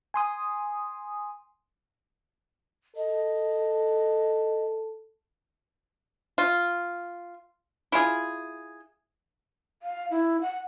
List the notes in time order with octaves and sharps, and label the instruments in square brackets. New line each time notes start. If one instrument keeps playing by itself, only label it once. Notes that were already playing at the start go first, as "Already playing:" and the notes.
[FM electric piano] G#5 C6 D#6
[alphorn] A4 [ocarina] D#5
[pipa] F4
E4 F4 G#4
[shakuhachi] F5
E4
F#5